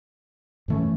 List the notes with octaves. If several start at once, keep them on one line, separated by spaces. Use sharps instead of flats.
G2 E3 A3 C#4